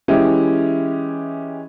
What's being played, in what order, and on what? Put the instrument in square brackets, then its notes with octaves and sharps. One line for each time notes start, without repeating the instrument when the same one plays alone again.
[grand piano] E3 G#3 C#4 E4 G4